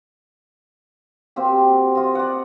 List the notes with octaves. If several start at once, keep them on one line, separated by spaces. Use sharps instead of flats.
A#3 C4 F#4 G4
F4 D#5
D5 F#5